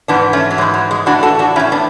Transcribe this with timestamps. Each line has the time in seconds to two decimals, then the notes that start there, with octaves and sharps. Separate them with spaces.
0.08 G#2 E3 B3 D4
0.33 A3 C#4
0.51 F#3
0.58 G#2 G#3
0.61 E3
0.74 F#3
0.91 G#3
1.06 A2 E3 D4 F#4
1.23 F#4 A4
1.39 D4 F#4
1.56 E3 C#4 E4
1.60 A2
1.72 B3 D4